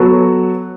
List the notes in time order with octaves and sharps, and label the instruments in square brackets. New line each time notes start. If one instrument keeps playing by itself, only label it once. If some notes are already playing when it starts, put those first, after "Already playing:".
Already playing: [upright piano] F#3 B3 F#4 A4